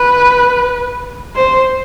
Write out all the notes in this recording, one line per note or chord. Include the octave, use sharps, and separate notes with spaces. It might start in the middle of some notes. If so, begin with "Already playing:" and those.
Already playing: B4
C5